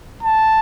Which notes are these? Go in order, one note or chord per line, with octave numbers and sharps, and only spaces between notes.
A5